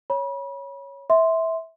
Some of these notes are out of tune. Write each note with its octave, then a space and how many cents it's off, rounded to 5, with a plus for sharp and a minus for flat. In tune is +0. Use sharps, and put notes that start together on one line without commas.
C#5 +0 B5 -35
E5 -15 C6 -5